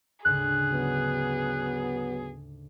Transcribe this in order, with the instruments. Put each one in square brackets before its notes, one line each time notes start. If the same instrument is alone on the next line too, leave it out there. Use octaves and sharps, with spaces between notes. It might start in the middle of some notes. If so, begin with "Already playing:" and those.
[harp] D2 G#2 C#3 [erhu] G#4 [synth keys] F#6
[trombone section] F#3 B3